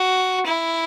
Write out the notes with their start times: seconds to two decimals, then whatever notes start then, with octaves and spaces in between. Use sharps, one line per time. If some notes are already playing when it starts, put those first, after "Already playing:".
Already playing: F#4
0.46 E4